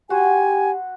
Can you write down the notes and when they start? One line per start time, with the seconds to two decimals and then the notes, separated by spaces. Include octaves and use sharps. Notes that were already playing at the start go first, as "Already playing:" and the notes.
0.10 F#4 G4 C5 F#5 G#5